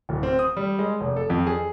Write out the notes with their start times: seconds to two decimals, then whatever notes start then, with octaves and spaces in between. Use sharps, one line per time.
0.09 D1
0.23 C4
0.39 D#6
0.57 G3
0.79 G#3
1.01 F1
1.16 A4
1.30 F2
1.47 G#4